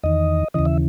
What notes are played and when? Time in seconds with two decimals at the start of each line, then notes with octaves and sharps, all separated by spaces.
0.03 E2 D#3 D#5
0.54 D#2 C#3 E3 D#5
0.65 E5